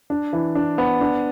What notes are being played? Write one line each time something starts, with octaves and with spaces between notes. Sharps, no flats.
D4
E3
D4
B3
D4